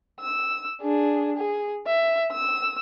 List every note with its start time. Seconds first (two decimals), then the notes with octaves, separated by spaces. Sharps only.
0.21 E6
0.81 D4 G#4
1.37 G#4
1.86 E5
2.32 E6